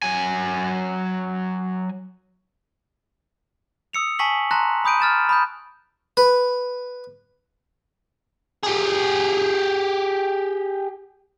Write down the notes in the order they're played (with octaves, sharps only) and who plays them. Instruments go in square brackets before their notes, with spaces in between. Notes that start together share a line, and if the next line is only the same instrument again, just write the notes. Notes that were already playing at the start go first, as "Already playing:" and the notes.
[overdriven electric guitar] F#3 G#5
[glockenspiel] D#6 E6 C#7 F7
G#5 A5 C#6 B6 F#7
A5 A#5 C6 F#6 A#6
B5 D#6 G6 D7 D#7
F6 A6 E7
B5 D#6 G6
[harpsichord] B4
[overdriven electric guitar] G4 G#4